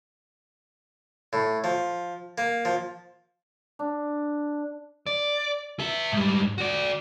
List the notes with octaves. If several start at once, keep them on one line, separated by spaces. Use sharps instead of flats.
A2
F3
A#3
F3
D4
D5
G#4 E5
G#2 G3
F#4 D5